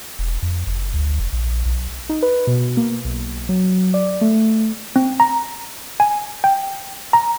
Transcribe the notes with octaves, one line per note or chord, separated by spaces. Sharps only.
E1
F2
F#1
D2
F1
A#1
B1
D#4
B4
B2
A#3
B1
F#3
D5
A3
C4
A#5
G#5
G5
A#5